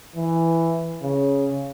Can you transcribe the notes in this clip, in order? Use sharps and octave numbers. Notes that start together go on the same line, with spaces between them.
E3
C#3